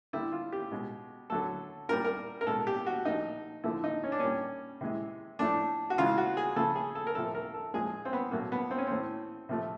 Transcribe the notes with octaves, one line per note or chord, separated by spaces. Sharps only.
D3 G3 E4
F4
G4
B2 G#3
D3 F#3 A3 A4
A#2 G3 A#4
A#4
A#4
B2 G#3 A4
G4
F#4
A#2 F3 A3 D#4
D3 F3 A3 E4
D#4
C#4
D4
A#2 G3 C#4
C3 E3 G#3
A2 F3 A3 D4
F#4
C#3 E3 G#3 F4
F#4
G#4
C#3 F3 A3 A4
G#4
A4
A#4
C3 F3 A3 A4
A#4
A4
A#2 F3 G#3 G#4
C4
B3
B2 F#3 A3 A#3
B3
C4
C#4
A2 E3 A3 C4
C3 F3 A3